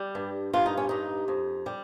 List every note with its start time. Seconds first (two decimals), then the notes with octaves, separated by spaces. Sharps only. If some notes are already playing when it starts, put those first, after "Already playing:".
Already playing: G3
0.15 G2
0.53 G2 F4
0.66 D#4
0.77 C#4
0.89 G2 D#4
1.28 F2
1.66 G3